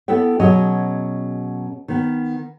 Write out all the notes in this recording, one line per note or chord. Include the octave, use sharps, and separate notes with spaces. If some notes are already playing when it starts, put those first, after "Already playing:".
B3 E4 A4 B4 G5
B2 F#3 C#4 G#4 D#5
D#3 B3